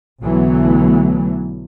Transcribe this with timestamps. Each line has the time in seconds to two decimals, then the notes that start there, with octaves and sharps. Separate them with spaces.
0.22 B1 D3 E3 F#3 A3 B3